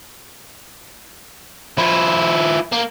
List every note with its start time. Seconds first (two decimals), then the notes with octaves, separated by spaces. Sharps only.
1.78 F3 E4
2.73 A#3